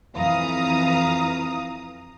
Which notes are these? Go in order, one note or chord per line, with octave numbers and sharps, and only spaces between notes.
F2 E3 F5 A#5 D#6